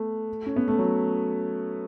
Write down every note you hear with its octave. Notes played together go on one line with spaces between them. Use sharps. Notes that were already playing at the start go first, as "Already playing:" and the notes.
Already playing: A3 B3
C#4
B3
A3
F#3